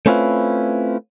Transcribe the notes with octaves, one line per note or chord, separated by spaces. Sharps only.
A3 C4 C#4 E4 F4 B4